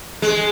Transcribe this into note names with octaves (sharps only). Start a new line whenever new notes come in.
G#3